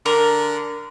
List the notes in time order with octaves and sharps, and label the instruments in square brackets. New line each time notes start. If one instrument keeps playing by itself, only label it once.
[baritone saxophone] D3 [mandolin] A#4